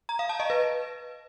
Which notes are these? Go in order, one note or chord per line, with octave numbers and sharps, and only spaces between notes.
A#5
F5
A5
D#5
B4